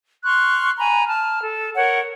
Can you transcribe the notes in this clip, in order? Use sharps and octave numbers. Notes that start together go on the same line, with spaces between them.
C6 C#6 F6 F#6
G#5 A#5 B5
A5 F6
A4
A#4 C#5 F#5